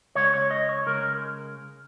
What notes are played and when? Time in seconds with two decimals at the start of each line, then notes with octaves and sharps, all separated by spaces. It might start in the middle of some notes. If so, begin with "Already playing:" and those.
0.15 C#3 G#3 C#5
0.34 C#5
0.51 D#5
0.69 C#5
0.86 C#3 G#3 A#4